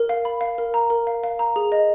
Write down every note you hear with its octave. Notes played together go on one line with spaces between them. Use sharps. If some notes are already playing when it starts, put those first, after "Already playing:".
Already playing: A#4
F5
B5
F5
A#4
A#5
A#4
F5
F5
A#5
G#4
D#5